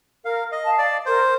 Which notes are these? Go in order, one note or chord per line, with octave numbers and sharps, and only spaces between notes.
A#4 F5
D#5
F5 A5
D5
A#4 C5